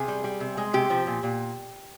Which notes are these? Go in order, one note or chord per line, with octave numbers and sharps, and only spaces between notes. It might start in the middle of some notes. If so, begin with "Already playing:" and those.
Already playing: C3 G#4
G3
G3
C3
G#3
C3 G4
F3
A#2
A#2